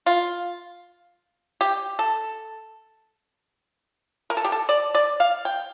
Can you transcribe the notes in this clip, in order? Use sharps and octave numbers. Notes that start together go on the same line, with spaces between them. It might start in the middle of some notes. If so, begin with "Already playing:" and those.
F4
G4
A4
A#4
A4
G4
A4
D5
D5
F5
G5